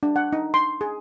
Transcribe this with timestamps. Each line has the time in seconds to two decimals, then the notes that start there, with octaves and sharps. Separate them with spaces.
0.03 D4
0.16 F#5
0.33 D#4
0.54 C6
0.81 G#4